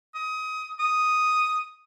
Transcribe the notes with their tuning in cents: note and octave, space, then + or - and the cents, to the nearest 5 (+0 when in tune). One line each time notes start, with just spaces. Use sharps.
D#6 +20
D#6 +0